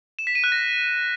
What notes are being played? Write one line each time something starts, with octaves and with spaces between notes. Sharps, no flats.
E7
B6
D#7
F#6
A#6